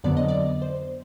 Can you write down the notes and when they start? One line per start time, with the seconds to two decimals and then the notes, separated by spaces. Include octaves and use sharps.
0.04 F2 D3 F#3 B3 D5
0.17 D#5
0.28 D5
0.62 C5